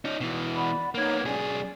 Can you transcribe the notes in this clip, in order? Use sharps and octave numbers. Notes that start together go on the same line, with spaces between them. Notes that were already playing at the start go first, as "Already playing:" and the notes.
C#4 D#4
B2 E3
D5 F#5 B5
A#3 B3 D#4 C#5 G#6
B1 C#4 G#4 D5